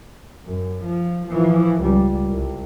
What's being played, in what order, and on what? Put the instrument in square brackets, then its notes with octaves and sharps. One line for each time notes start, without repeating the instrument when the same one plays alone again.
[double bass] F#2
F3
E3 F3
C#2 G3
C2